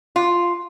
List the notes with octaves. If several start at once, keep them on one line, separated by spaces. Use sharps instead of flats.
F4